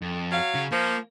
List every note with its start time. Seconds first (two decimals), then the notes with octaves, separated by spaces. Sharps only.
0.02 F2
0.32 F#3 F5
0.54 C#3
0.72 F3 A#3